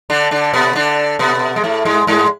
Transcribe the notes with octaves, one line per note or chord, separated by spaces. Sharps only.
D3 D4
D3 D4
B2 B3
D3 D4
B2 B3
G#3
A2 A3
G#2 G#3
G#2 G#3